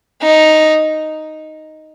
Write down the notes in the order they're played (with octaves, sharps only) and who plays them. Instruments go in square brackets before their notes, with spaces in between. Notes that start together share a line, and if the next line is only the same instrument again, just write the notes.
[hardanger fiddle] D#4